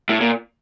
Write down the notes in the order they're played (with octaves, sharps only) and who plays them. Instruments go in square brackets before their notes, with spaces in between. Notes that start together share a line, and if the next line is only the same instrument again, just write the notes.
[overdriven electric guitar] A2
A#2